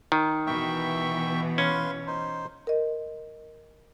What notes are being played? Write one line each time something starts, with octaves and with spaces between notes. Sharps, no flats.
D#3
B2 E3 E5 G5 C#6
C#4 B4 F5 C6
D#4 C5
A#4 D#5